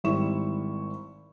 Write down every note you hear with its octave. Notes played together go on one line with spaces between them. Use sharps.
G#1 G3 E4 C#6 E7